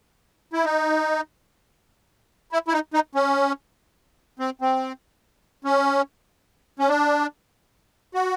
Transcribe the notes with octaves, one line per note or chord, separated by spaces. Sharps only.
E4
D#4
E4
E4
D#4
D#4
C#4
C4
C4
C#4
C#4
D4
F#4